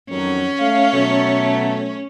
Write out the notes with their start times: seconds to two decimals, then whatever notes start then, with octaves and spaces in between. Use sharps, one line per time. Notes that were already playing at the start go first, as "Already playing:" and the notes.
0.10 F2 D#3 F#3 C#4
0.59 A3 F5
0.91 B2 F#3 A3